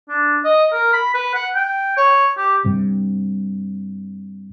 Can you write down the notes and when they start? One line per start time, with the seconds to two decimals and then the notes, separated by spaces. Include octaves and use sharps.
0.10 D4
0.45 D#5
0.73 A#4
0.93 B5
1.14 B4
1.34 F#5
1.55 G5
1.97 C#5
2.37 G4
2.65 G2 C3